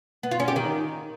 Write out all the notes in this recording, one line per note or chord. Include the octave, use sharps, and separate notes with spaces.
B3
F4
C#4
G4
D#3